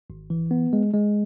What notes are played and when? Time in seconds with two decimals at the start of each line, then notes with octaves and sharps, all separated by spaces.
0.10 G#1
0.30 E3
0.51 B3
0.73 G#3
0.94 G#3